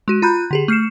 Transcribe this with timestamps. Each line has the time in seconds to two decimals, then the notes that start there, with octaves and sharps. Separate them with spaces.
0.08 G#3 F#4 D#7
0.22 F4 A#5 B5 F#6 G6
0.51 D3 G4 G#4
0.68 A3 F6 C7 C#7 E7